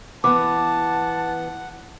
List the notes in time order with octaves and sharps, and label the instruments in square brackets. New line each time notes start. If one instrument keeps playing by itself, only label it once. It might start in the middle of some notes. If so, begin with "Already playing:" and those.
[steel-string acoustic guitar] E3 B3 [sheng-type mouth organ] F#5 [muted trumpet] A5 [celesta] D6